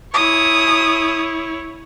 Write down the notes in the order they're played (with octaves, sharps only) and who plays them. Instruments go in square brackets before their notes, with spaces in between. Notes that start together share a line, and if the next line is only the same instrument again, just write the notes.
[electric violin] E4 C#5 [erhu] D#6